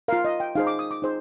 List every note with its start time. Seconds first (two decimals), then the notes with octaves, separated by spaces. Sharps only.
0.08 F4 A#4 F5
0.25 D#5
0.40 G5
0.55 D#4 G#4 C5 F5
0.67 D6
0.79 D#6
0.91 D6
1.02 D#4 G#4 C5